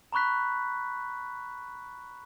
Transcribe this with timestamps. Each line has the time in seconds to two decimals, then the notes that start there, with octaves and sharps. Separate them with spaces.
0.13 A#5 B5 C#6 F#6 B6